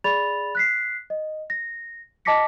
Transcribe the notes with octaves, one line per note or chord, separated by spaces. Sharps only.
G#4 D5 B5 A6 F7
F#6 B6 C7
D#5
A#6
D#5 A5 D6 A#6 B6 C#7